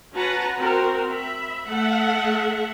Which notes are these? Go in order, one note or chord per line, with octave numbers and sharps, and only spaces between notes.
C#4 F#4 B4 F#5 A5 A#5
C4 F#4 A#4
E5 B5
A3 A4 E5 F#5